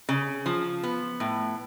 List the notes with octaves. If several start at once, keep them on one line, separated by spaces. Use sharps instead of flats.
C#3
F3
B3
A2